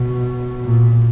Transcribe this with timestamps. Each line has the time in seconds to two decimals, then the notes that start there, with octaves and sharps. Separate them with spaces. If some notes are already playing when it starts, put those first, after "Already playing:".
Already playing: B2
0.65 A#2